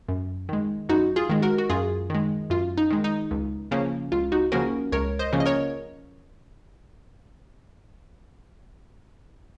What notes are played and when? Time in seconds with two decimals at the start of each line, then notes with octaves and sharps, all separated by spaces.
0.09 F#2
0.49 D#3 G#3
0.89 F#2 D#4 F#4
1.16 F4 G#4
1.29 D#3 G#3
1.42 F#4 A#4
1.58 F#4
1.70 F#2 F4 G#4
2.10 D#3 G#3
2.50 F#2 F4
2.78 D#4
2.91 D#3 G#3
3.04 D#4
3.31 C#2
3.71 C#3 F3 A#3 C#4
4.12 C#2 F4
4.32 D#4 F#4
4.52 C#3 F3 A#3 C#4 F#4 A#4
4.92 C#2 A#4 C#5
5.19 C5 D#5
5.33 C#3 F3 A#3 C#4
5.40 D#5
5.46 A#4 C#5